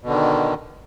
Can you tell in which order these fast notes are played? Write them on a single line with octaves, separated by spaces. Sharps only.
B2 D3 D#3